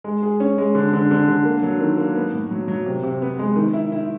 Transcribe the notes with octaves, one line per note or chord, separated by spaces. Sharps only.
G#3
G#4
C#4
G#3
D3
D3
D3
D3
A#3
F#3
D#3
A#3
B3
A2
F#3
F#3
C3
C3
B3
G#3
D#3
E4
E4